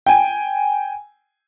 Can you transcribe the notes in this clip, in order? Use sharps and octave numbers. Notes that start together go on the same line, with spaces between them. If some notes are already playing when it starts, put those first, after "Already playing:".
G5 G#5